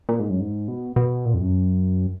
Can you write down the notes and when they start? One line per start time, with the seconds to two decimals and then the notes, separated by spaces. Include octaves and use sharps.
0.09 A#2
0.20 G#2
0.30 F#2
0.40 G#2
0.68 B2
0.96 B2
1.26 A#2
1.34 F2
1.41 F#2